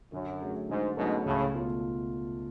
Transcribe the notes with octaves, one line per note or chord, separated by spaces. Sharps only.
F#2 D3
F#3 A3 C#4 G#4
G#2 D3
G#2 B2 F#3 A3 C#4 G#4
C#2 A2 C#3
B2 A3 F4 A4